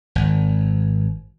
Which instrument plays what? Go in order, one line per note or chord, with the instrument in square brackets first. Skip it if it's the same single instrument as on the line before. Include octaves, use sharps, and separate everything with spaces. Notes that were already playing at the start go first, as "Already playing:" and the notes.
[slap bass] G#1